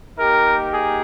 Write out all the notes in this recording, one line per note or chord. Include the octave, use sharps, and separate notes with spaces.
A#3 D#4 G4 A#4
G#4